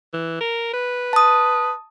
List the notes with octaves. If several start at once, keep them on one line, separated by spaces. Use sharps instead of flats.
E3
A#4
B4
A5 D#6